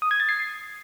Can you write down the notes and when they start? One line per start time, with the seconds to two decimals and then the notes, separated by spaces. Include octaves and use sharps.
0.02 D#6
0.11 G#6
0.20 A6
0.29 C7